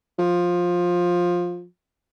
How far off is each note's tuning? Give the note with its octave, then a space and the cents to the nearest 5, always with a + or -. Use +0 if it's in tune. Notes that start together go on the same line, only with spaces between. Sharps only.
F3 +15